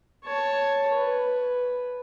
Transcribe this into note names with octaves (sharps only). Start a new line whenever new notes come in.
C#5 A5
B4